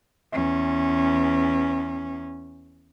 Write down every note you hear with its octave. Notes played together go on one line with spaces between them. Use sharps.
E2 C#4